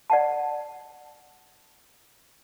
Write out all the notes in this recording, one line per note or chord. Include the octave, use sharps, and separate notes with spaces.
D5 F#5 A5